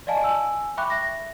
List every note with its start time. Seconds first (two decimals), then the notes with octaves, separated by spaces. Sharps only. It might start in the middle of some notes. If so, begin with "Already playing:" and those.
0.07 D5 D#5 F5 G#5 A5
0.21 G#5 E6
0.77 E5 G5 B5 C#6 D6 F#6
0.90 E5 A#6